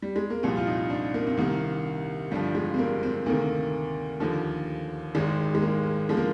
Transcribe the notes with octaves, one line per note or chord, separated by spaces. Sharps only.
G3
G#3
A#3
C2 A#2 F3 C4
F4
D#4
D4
A#3
C4
C2 C3 D#3 A#3
G1 G2 F3 G3
G#3
C4
A#3
C4
D2 C3 D#3 A#3
D#2 D3 F3
G#1 G#2 D#3 G#3
G#3
A#3
D3 F3 G#3
A#3